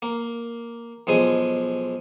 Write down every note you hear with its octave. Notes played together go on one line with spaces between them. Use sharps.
A#3
B1 F3 G#3 G#4